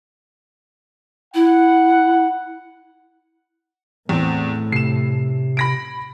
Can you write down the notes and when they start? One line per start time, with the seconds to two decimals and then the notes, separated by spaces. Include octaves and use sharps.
1.35 E4 F#5
4.09 E2 A2 C4
4.72 C3 C7 E7
5.57 B5 A#6 D7